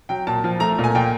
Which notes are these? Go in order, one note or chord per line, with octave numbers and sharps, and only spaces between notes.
F#3 G5
A#2 A5
F3
A3 A#5
A#2
G#5
A#2 G5